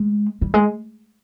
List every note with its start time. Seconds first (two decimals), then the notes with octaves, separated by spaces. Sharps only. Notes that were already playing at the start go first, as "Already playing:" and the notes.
Already playing: G#3
0.41 G3
0.54 G#3